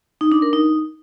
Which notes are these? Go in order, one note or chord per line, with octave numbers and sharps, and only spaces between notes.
D#4
D4
A#4
D#4